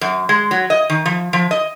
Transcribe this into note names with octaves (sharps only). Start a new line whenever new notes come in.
F#2
G#3
F#3
D#5
D#3
F3
F3
D#5